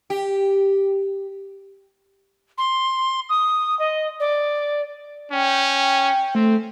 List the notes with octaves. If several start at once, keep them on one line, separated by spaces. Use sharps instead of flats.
G4
C6
D#6
D#5
D5
C#4 G5
A3 C4